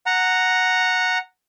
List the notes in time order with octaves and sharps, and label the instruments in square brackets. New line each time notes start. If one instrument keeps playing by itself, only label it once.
[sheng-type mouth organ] F#5 A#5